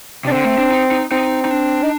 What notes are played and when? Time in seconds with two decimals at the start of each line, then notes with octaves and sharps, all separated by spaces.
0.25 C3 D4
0.31 D3 C4
0.44 A3
0.58 D4
0.71 D#4
0.92 D#4
1.11 C4 D#4
1.45 D#4
1.51 D4
1.83 D#4